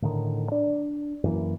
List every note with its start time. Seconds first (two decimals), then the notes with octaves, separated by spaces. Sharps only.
0.02 A2 D3 D#3
0.52 D4
1.24 F#2 E3 A#3